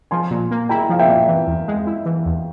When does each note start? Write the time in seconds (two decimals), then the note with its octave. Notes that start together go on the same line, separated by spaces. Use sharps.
0.11 F3 G#5 C6
0.31 A#2
0.51 A#3
0.69 E4 G5 A#5
0.89 F3 F5
0.99 E5 G5
1.08 A#2
1.28 E3
1.47 E2
1.68 G#3
1.87 E4
2.06 E3
2.25 E2